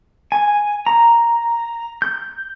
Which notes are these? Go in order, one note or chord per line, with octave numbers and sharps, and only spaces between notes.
G#5
A#5
G6